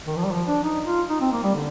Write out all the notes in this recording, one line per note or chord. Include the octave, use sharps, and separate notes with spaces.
D#3
F3
G3
F3
D4
D#4
F4
D#4
C4
A#3
G3
D3